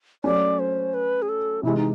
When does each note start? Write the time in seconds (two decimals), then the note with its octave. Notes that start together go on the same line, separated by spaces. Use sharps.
0.24 F#3 A3 C#4 D5
0.59 C5
0.94 B4
1.22 G#4
1.29 A4
1.63 C3 E3 G#3 E4
1.77 D#4